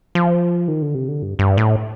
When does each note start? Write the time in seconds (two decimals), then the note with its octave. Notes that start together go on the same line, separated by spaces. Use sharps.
0.15 F3
0.68 D#3
0.82 D3
0.95 C3
1.08 D3
1.22 G2
1.39 G2
1.57 A2